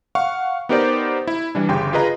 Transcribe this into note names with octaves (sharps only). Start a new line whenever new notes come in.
F5 F#5 C#6
B3 D#4 G4 A#4 C5 D5
E4
E3 G3 D4
G1 C#3 G4 G5 C6
F4 G#4 B4 D#5 A#5